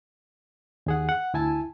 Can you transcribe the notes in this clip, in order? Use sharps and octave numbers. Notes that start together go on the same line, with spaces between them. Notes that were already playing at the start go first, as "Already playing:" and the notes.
D#2 G#4 F#5
F#5
D2 E4 G#5 A5